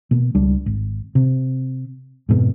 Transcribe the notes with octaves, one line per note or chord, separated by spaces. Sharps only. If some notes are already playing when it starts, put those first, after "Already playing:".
B2 A#3
C#2 G3 D4
G#1
C3
F2 G#2 B2